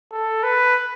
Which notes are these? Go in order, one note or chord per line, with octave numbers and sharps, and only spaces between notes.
A4
B4